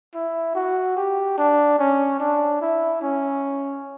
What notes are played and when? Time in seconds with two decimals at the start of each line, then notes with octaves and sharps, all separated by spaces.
0.14 E4
0.55 F#4
0.97 G4
1.38 D4
1.79 C#4
2.20 D4
2.61 E4
3.02 C#4